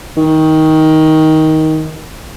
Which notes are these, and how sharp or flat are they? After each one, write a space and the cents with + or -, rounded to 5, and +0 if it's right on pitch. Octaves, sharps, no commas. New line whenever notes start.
D#3 +15